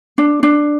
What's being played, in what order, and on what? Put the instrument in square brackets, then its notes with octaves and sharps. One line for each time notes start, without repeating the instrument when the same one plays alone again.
[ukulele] D4
D4